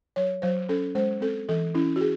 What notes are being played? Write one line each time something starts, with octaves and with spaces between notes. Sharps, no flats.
F#3 C#5
F#3 C5
C#4 A4
G#3 C5
C4 A4
E3 A4
C#4 E4
F#4
G#4